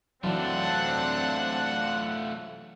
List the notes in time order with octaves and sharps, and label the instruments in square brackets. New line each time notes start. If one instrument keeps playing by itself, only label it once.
[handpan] E3 F#3 [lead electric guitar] A3 F4 [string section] C4 D4 [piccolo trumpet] F#5